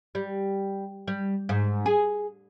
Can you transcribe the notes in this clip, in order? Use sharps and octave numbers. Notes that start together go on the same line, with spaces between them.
G3
G3
G#2
G#4